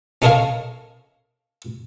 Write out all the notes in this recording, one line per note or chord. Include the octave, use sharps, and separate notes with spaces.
C#4 D#4 A4 A#4 C#5 F5